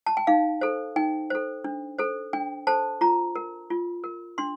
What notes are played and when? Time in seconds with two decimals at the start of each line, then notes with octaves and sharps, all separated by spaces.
0.06 A5
0.17 G5
0.27 D#4 F5
0.61 A4 C5
0.96 D#4 G5
1.30 A4 C5
1.64 D4
1.98 A4 C5
2.33 D4 G5
2.67 A4 C5 A5
3.01 F4 A#5
3.35 A#4
3.70 F4
4.04 A#4
4.38 D4 C6